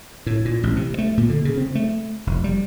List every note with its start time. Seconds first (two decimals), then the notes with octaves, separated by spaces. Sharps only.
0.26 A2
0.45 A#2
0.63 A1
0.76 C3
0.98 A3
1.17 A#2
1.29 D3
1.45 C#3
1.57 C4
1.75 A3
2.27 F1
2.44 G3